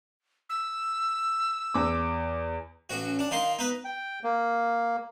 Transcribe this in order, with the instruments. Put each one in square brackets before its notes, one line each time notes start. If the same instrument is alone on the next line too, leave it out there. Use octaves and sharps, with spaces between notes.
[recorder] E6
[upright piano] E2 D6
[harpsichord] A1 F#4
[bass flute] C#4
[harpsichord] D4
[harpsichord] D#3 D#4 C6 [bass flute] F5
[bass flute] B3 [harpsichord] D#4 B4
[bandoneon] G5
A#3